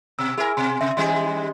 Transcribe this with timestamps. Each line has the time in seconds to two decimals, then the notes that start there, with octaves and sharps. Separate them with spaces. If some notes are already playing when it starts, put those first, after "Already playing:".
0.19 B2 E6
0.38 E4 G#4 A#4 G#5
0.57 B2 C6
0.81 C3 E5
0.97 D#3 G3 G#3 C#4 D#5 C6